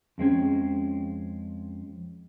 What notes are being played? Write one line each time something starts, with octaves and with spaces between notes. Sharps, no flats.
F2 G#3 C4 C#4